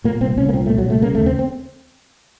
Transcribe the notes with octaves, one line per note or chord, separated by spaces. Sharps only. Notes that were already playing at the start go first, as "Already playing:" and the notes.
A#2 A#3
C2 C4
C2 C#4
A#3
A#2 C4
A3
A#2
F#3
C2 A3
C#3 A#3
A3
D#2
C4
C4